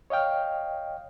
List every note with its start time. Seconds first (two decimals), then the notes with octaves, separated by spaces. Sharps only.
0.10 C#5 D#5 F5 G5 F6